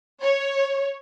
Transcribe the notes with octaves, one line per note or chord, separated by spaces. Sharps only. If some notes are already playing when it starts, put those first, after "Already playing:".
C#5